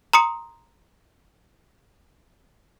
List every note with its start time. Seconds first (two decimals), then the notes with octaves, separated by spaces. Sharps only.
0.13 A#5 C6 D#6 C#7